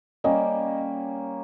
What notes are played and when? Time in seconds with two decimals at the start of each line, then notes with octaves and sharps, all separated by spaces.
0.24 G3 A#3 C#4 D#5